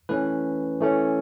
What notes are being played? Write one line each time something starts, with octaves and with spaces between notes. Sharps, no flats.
E3 A3 C#4 B4
E3 A3 C#4